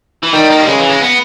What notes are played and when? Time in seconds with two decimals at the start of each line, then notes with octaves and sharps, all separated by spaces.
0.23 E3
0.33 D#3 G3
0.50 A#3
0.60 G3
0.67 C#3 G#3
0.79 E3
0.90 G#3
1.01 B3